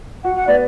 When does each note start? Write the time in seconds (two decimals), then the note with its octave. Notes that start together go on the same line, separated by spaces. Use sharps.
0.24 F#4 F#5
0.36 F#5
0.47 B3 D5